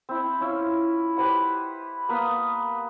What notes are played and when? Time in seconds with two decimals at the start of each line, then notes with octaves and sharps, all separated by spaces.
0.09 C4 E4
0.41 C#4 E4 F4
1.17 G4 B4 C5 F#5
2.09 A#3 B3 B4 D#6